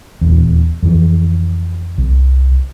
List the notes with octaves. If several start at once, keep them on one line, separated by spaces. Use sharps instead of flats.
D#1 E2
F2 E3
C2